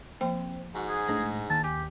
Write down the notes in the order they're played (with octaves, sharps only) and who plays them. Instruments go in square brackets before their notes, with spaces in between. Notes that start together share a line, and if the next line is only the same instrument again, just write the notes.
[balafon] F3 A#3 G5 [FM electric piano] C4
[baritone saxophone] G#2 [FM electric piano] F#4 F#5
[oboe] G#4
[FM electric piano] A2 G#3 A#6 [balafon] D4
[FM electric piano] D#2 [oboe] A5
[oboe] G4 [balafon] G#5